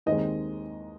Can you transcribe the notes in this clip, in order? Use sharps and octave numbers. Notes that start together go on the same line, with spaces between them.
D#2 D#3 G#3 C4 D#5